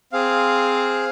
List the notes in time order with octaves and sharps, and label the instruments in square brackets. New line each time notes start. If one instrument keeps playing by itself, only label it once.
[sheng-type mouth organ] C4 G#4 F5